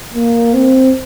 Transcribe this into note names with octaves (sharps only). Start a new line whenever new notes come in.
A#3
C4